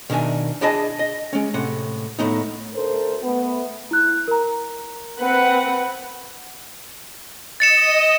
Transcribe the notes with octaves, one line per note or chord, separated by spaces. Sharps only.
B2 D#3 D4 E5 G#5
D4 E4 G#4 D#5 G#5 A5
D#5
G#3 C#4
A2 C3 F#5
A2 B3 D#4
D2 A4 A#4 C5
A3 B3
E4 F#6
A#4 A#5
C4 B4 F#5
D#5 A6 C#7 E7